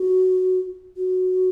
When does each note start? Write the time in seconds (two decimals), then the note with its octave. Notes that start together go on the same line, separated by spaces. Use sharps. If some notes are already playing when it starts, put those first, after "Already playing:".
Already playing: F#4
0.97 F#4